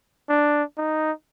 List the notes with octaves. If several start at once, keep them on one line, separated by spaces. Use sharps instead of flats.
D4
D#4